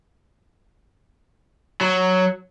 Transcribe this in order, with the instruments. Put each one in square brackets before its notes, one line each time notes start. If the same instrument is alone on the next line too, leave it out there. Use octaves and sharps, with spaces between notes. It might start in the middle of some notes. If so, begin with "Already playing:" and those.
[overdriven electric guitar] F#3